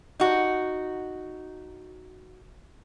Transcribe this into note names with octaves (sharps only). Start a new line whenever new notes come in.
D#4 F#4